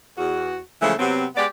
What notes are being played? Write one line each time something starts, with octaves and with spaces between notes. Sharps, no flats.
E2 F#4
C#3 E3 F3 G#3 A3
C3 F#3 B3 C4
G#3 B3 G4 D5